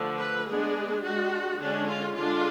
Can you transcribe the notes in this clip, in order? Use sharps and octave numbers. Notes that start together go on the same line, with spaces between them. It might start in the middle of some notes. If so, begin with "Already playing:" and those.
Already playing: D3 F3 A3
B4
G#3 B3 D4 G#4
G#3 D4 F#4
D3 G#3 C#4 D4
F4
D3 G#3 D4 F4